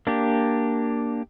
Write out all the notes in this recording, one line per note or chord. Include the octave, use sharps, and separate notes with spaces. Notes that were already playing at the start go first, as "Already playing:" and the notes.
A#3 D4 G4